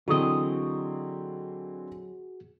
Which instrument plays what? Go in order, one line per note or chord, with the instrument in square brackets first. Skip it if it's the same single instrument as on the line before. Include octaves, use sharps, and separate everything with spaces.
[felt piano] D3 E3 C4 [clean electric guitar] F#3 D#5 [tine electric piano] F#4 G#4